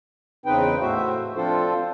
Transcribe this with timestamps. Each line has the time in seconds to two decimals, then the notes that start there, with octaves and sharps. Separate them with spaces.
0.46 E2 C#3 C4 D#4 B4 G5
0.80 A2 A3 F#4 C5 E5
1.35 F3 C4 D4 F4 A4 C5